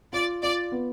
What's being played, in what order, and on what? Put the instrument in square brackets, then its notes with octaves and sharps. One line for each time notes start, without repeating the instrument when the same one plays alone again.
[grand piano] F4 [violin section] D5
[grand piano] F4 [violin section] D5
[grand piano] B3